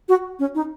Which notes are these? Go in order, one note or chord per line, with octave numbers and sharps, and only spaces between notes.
F#4
C#4
D#4